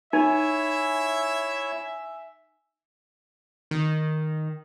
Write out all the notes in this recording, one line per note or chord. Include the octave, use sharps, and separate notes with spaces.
D#4 E4 C#5 E5 G#5
D#3